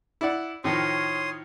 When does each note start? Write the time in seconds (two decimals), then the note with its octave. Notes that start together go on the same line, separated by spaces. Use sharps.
0.21 E4 D5 F#5
0.64 A2 D#3 F3 C#5 C6 D#6